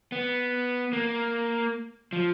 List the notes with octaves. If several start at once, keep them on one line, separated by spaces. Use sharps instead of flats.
B3
A#3
F3